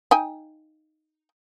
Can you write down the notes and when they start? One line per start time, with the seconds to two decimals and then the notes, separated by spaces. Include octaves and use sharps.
0.11 D#4 G5 G#5